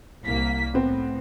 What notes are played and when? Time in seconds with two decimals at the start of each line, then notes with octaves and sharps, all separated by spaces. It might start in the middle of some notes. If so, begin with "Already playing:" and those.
0.25 C2 A#3 B6
0.74 A2 B3 C4